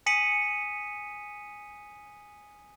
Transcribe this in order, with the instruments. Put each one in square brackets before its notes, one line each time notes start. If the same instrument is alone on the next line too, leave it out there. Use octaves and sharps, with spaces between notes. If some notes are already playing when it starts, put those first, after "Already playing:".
[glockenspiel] G#5 D#6 B6 C#7 D#7 F#7